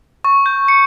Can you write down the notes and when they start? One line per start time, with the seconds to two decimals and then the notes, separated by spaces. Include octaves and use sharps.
0.24 C#6
0.46 G6
0.68 C#7